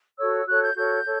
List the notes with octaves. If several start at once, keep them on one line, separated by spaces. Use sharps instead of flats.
F#4 A4 C#5 E6
F#4 A4 C#5 F#6
G6
F#4 A4 C#5 G6
A4 C#5